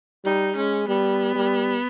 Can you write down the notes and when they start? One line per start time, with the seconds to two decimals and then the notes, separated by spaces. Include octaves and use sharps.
0.25 G3 D#4
0.56 G#3 C#4
0.88 G3 B3
1.35 G3